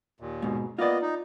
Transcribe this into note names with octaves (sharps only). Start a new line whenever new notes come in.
D#2 A#2
G#2 B2
A#3 B3 F4 D5 D#5
D#4